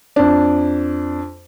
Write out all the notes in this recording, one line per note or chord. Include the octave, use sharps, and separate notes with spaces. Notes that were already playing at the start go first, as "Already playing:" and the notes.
F2 D4